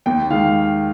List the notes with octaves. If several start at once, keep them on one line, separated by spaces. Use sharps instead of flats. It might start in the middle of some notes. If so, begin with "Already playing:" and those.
D#2 G5
D#3 G#3 F5